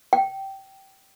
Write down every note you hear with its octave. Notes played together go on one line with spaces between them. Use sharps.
G5